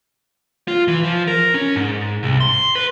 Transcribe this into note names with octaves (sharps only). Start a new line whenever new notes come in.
F4
E3
F3
A#4
C#4
G#2
C2
C6
B4